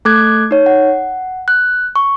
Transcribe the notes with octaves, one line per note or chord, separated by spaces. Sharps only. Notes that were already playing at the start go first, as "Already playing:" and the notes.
A3 A4 D6 F#6 G#6
D#4 C#5
F#5
F#6
C#6